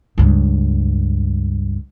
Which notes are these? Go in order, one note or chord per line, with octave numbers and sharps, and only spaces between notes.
C#2 G2